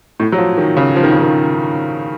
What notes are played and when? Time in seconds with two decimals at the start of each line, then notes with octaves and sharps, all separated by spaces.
0.20 A2
0.32 F#3
0.38 F3
0.58 D#3
0.77 C#3
0.96 F3
1.03 D#3
1.12 C#3
1.20 D#3